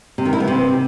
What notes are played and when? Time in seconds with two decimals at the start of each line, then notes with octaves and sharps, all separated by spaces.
0.18 C3
0.25 D#3
0.33 E4
0.40 B3
0.48 C3